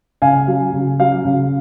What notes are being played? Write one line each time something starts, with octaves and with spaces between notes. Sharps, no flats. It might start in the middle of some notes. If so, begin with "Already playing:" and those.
C#3 F5 G#5
F#3
C#3
F#3 F5
C#3